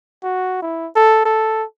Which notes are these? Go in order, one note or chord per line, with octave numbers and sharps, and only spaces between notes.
F#4
E4
A4
A4